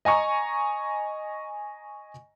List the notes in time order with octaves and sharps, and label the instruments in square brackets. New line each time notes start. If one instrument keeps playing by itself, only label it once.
[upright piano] D#5 G#5 A#5 C#6